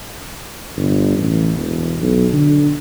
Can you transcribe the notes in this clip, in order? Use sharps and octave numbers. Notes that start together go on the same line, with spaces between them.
G1
A1
E1
B1
D3